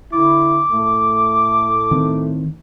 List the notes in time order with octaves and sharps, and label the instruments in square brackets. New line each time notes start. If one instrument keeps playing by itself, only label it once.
[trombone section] D3 E4 [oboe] D6
[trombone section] A2 A3
[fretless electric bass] D#3 C4